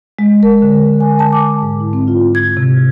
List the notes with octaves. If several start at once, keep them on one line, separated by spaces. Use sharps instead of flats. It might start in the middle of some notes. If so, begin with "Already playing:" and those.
G#3
A#4
D3
G#5
A5
D6
G#2
E4
C4
F4
G#6
C3